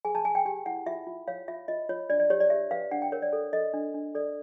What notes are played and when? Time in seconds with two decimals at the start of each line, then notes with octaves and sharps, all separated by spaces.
0.05 G#4 G#5
0.15 A5
0.25 G#4 G#5
0.35 G5
0.45 G4 G5
0.66 E4 F#5
0.86 F4 E5
1.07 F4
1.28 C#5 F5
1.48 F4 E5
1.68 F4 D#5
1.89 F4 C#5
2.10 D4 D5
2.20 D5
2.30 G4 C#5
2.40 D5
2.50 G4 E5
2.71 B4 F5
2.91 D4 F#5
3.02 G5
3.12 A#4 C#5
3.22 D5
3.33 A4
3.53 A4 D#5
3.74 D4
3.94 D4
4.15 A4 D5